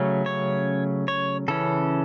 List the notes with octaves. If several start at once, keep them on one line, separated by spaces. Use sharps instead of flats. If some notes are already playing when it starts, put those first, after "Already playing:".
Already playing: C#3 F#3 A3 C#4
C#5
C#5
C#3 E3 C#4 A4